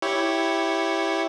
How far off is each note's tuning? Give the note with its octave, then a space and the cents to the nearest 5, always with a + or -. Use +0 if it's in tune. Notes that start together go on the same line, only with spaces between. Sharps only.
E4 +0 G4 +0 C#5 +0